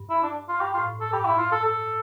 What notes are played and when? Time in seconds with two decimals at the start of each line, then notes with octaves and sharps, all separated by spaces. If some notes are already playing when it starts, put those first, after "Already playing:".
Already playing: G2
0.10 E4
0.23 D4
0.49 F4
0.61 G2 G4
0.74 F4
0.78 A2
1.00 A4
1.13 G2 G4
1.25 E4
1.38 F4
1.52 A4
1.65 A4